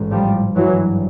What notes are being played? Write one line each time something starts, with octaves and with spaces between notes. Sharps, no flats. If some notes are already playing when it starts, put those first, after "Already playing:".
Already playing: A1 G#2
F3 G3
G#1 G2 E3 F#3